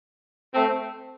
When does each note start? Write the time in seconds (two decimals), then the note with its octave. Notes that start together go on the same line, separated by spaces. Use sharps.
0.54 A3 C4